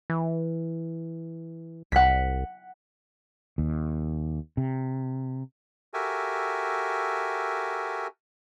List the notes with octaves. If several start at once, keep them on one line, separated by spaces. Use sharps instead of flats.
E3
C2 F#5 B6
D#2
C3
F#4 G4 A4 A#4 E5 G#5